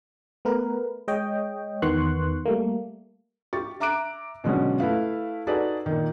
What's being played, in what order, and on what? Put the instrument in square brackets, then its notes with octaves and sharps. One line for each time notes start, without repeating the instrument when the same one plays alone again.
[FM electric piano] A3 B3 A#4 B4
G#3 C#5 D#5 G5
E2 D#3 B3 C6 C#6 F#6
G3 A3 A#3
[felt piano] G4 C#6 A6
E5 A#5 D6 F#6 D7
B2 D3 F#3 G#3 C#4 F#4
A3 E4 B4 F5
D#4 F#4 G#4 A4 B4 D5
A#2 D#3